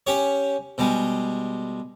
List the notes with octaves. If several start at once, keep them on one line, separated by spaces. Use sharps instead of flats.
C#4 G4 C#5
B2 G3 G#3